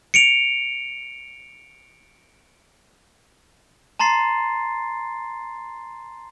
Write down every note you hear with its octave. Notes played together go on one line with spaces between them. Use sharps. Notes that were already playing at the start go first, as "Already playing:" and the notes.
C#7 D7 F7
A5 A#5 C6 A6 C7